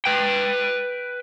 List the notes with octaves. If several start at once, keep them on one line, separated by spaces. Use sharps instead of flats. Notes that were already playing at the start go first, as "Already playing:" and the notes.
B4 G5